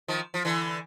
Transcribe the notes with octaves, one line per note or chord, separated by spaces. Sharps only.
D#3 F3
F3
D3 E3